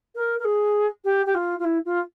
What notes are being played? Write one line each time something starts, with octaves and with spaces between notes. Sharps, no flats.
A#4
A#4
G#4
G4
G4
F4
F4
E4
F4